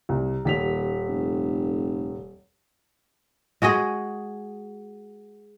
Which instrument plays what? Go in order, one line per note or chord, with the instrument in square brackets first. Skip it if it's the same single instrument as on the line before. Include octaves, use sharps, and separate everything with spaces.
[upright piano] C2
[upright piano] D#1 B6 F7 [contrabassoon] D#2
[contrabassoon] F1
[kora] G#3 F#4 G#4 D#5